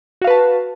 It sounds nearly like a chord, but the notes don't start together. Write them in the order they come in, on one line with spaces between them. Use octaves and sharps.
F#4 F5 B4 A5